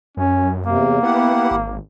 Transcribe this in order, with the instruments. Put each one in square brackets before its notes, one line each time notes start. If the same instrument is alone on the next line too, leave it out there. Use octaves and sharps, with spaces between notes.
[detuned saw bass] F#2 [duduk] C#4
[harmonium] E2 C3 [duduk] A#3
[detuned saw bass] B3 [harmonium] E4 G4 F#5
[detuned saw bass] G#1